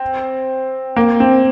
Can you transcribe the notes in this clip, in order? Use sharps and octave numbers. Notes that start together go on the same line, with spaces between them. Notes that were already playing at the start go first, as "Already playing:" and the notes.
Already playing: C4
A#3
C4